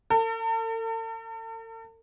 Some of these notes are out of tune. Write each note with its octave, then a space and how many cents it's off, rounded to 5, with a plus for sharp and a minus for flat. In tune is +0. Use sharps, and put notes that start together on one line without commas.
A4 +45